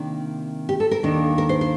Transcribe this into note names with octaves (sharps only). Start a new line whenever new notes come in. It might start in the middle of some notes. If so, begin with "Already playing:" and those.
Already playing: C3 D#3 A#3 D4
G4
A4
A#4
D#2 D#3 A#3 D4
A#4
C5
C5